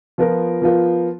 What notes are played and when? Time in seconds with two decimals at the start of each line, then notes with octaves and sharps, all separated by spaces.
0.18 F3 B3 F4 A#4
0.62 F3 B3 F4 A#4